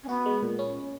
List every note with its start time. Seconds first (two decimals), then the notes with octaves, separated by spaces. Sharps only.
0.03 C#4
0.09 B3 F#4
0.26 G#3
0.43 A#2
0.59 C#4